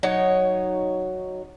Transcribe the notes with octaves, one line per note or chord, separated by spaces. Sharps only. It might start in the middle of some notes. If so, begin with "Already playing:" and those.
F#3 D#4 C#5